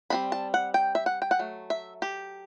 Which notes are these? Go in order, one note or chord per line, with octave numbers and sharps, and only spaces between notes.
G3 C4 D#4 B5
A5
F#5
G5
E5
F#5
G5
F#5
F#3 A3
E5
G4